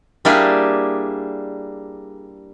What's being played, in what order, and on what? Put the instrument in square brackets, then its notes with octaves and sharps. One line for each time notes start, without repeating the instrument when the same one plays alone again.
[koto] G3 A#3 D4 E4 G4 G#4